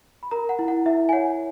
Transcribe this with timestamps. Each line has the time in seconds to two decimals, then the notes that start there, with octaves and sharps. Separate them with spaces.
0.23 B5
0.31 A#4 A#5
0.49 F#5
0.59 E4
0.68 F#5
0.86 E4 E5
1.09 G#5
1.13 C#5 F#5